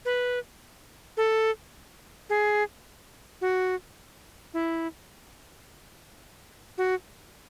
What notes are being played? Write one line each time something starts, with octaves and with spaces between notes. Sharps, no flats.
B4
A4
G#4
F#4
E4
F#4